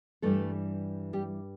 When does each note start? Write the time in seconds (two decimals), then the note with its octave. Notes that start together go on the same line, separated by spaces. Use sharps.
0.22 G2 E3 G3 A3 A4
1.13 G3 G4